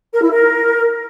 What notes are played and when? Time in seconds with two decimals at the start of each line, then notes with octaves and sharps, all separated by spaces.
0.13 A#4
0.22 E4
0.30 A#4